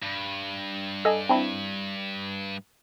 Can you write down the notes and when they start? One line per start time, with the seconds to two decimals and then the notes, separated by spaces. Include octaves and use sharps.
0.03 G2
1.05 A4 D#5 G#5
1.29 C4 D4 E4